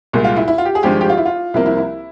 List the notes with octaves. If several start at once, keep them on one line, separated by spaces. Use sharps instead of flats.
C2 A#2 G#3
F4
E4
E4
F4
G4
G#4
G#1 G2 F3 G#3 G4
G4
F4
E4
F4
C2 C3 F3 A#3 E4
E4
E4